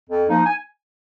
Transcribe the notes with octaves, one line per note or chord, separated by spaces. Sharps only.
F2
F3 A#3 D#4
G#5